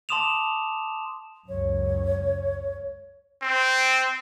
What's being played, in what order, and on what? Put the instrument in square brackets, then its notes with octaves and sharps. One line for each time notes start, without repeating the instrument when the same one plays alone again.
[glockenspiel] A5 C6 D6 D#6 E7 F7
[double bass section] C#2 F#2 [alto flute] C#5
[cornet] C4